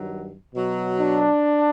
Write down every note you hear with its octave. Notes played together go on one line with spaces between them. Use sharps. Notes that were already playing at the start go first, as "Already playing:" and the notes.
Already playing: G2 D#3 F#3
B2 F#3
D4